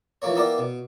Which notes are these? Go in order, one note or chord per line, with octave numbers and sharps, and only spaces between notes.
E3 F3 A3 A#3 C#5
A#3 B3 E4 A#4 D5 G5
B2